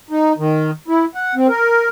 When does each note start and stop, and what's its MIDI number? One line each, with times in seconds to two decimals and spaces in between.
0.10 0.33 63
0.38 0.71 51
0.88 1.05 64
1.15 1.35 78
1.35 1.47 60
1.48 1.89 70